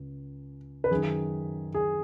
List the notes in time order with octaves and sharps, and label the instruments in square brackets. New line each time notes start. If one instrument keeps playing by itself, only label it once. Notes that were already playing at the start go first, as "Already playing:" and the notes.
Already playing: [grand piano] C#2
B4
F#2 D#3 G#4
G#4